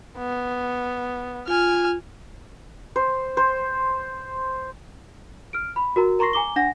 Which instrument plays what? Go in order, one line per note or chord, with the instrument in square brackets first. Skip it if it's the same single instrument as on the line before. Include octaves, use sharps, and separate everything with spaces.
[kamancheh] B3
[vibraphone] F4 [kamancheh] G#5 F6
[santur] C5
C5
[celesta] F6 D7
B5
F#4 A#4 A#5
A#4 A#5 C6 C#6 A#6 C7
G#5 A#5 D6 G7
D4 F#5 A#6